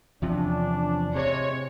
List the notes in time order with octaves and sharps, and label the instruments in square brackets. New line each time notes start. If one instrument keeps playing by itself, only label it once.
[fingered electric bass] E2 C3 F3 [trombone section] C#4 D4
[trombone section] A2 G#3 C4 [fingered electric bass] C3 [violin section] C#5